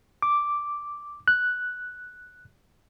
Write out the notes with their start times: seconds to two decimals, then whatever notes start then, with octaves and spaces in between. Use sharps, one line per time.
0.22 D6
1.28 F#6